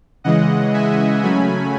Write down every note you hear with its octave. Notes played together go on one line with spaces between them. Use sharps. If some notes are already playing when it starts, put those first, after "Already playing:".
C#3 E3 G#3 D#5 F#5
E5 G#5
C#3 F#3 A3 C#4 G#5 B5